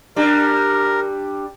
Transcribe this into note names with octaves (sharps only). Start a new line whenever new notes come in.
G3 D4 A#4